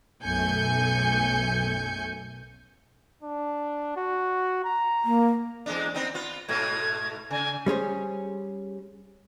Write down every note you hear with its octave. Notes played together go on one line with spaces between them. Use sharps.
B1 F#2 A3 G#5 G6 C#7
D4
F#4
A#5
A#3
E2 G#3 D4
B3 C4 D#4
B3 F4
G#2 B2 A3 G#6
C#3 G#5
G3 C#4 G#4 C5